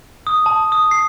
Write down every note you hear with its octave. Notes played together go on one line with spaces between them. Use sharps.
D#6
A5
D#6
C7